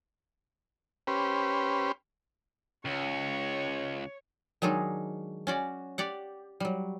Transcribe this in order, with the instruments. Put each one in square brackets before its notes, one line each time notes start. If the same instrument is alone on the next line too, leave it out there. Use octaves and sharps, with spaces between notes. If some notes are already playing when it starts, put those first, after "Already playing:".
[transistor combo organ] C#4 G4 B4 C5
[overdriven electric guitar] C#2 [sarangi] C#5
[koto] D#3 F#3 G#3 D4 D#4
C#4 F#4 D5
G4 D5 F#5
F#3 G3